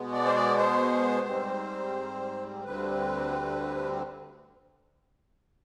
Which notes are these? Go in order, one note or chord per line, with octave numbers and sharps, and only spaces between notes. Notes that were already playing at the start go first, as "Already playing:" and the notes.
Already playing: B2 G#3 B3
D5
C5
D5
C5
G#2 G3 C4
D2 D3 G3 C4 B4